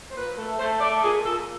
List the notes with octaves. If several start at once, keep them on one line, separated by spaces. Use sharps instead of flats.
C5
A#2 B4
A3
A3 C5
A3 D5
A#2 G#4
A#2 A4